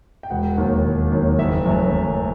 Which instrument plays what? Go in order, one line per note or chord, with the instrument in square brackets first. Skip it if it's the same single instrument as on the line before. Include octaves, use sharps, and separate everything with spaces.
[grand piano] G5
E1 F#5
D#2 D#3 F#3
E1
D#2 D#3 F#3
F#1 E5
F#2 F#3 A3
F#1